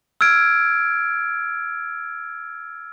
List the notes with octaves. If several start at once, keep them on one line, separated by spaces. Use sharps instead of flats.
E6 F6 G#6 D7